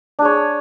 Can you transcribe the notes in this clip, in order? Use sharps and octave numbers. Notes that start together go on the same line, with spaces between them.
D4 G#4 C#5